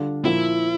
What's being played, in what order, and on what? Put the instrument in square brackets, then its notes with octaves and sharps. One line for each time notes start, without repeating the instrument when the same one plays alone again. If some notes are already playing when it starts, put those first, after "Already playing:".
Already playing: [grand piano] D3 G3 D4 F4 A4
[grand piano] A#2 F3 A#3 [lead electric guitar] E4